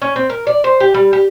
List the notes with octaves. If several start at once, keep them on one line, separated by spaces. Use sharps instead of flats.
C#4
C4
A#4
D5
C5
G4
G3
G4